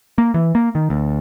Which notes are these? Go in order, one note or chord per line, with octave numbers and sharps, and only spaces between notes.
A#3
E3
A#3
D#3
D2